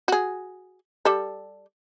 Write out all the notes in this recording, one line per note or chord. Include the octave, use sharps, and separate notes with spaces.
F#4 G#4
G3 A4